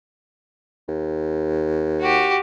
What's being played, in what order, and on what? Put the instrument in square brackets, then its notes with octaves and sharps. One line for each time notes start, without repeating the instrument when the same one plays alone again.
[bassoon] D#2
[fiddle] F#4 G4